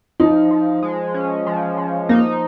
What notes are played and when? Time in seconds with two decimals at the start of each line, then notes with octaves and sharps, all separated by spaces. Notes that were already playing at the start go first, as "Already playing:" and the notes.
0.20 F3 D#4
0.51 F3
0.83 G#3
1.14 C#4
1.47 F3
1.78 F3
2.09 A#3 D#4